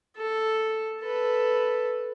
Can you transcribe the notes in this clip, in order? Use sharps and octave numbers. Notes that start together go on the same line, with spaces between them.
A4
A4 B4